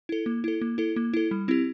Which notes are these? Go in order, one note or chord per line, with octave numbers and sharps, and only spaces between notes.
E4 A4
A#3
E4 A4
A#3
E4 A4
A#3
E4 A4
G3
C4 E4 G4